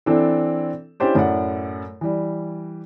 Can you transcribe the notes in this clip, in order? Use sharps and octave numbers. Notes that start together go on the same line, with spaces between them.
E3 C4 D4 E4 A4
C#4 D4 E4 G4 C5 D5
F#2 A2 D5 F#5
E3 G3